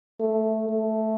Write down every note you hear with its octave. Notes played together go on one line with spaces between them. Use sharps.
A3
A3